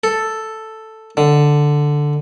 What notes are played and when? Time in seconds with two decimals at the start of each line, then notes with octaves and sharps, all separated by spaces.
0.04 A4
1.17 D3